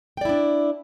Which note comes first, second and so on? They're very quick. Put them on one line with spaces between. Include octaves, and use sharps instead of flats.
G5 D5 E4 D4